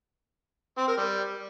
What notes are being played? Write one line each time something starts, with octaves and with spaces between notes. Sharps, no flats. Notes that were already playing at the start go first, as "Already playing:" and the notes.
C4
A#4
G3